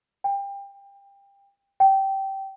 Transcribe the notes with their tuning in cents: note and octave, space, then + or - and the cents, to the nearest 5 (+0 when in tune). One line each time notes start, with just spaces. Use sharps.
G5 +25
G5 -15